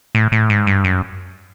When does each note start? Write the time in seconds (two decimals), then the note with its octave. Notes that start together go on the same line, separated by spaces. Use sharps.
0.15 A2
0.32 A2
0.50 G#2
0.67 G2
0.84 F#2